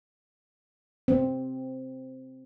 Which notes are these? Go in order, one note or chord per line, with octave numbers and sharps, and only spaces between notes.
C4